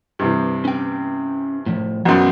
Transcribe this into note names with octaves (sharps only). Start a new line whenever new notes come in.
G2 C3 E3
C#4 G5
A2 F3
B1 F#2 F3 C6